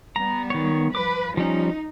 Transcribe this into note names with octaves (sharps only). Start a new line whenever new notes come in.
G3 B3 A#5
D#3 C#5
F3 B4 D6
F3 G3 C#4 D#4